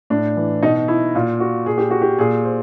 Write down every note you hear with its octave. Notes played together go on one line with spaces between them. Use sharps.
A2 D4
E3
B2 D#4
E4
A#2 F4
F#4
A#2 G#4
G4
F#4
G4
A#2 G#4
C5